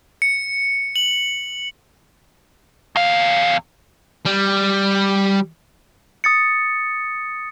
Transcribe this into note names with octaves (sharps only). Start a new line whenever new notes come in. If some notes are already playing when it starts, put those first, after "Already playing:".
C#7
F#7
E2 F5
G3
D#6 A6 C#7